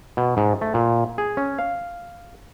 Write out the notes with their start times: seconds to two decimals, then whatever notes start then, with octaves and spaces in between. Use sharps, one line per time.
0.17 B2
0.37 G#2
0.61 A3
0.74 A#2
1.18 G#4
1.37 C#4
1.58 F5